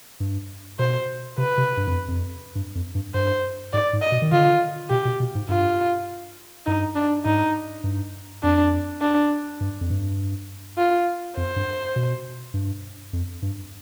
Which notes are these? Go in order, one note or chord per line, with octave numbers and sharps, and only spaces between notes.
G2
B2 C5
C3 B4
C3
G2
F2
F2
G2
F2
G2
G2 C5
G#2 D5
G#2
D#5
B2
D#3
D3 F4
B2 G4
B2
B2
G#2
G2 F4
G2 D#4
D4
G#2 D#4
G2
F2 D4
D4
G2
F2
G2
F4
F2 C5
G2
B2
G2
F2
G2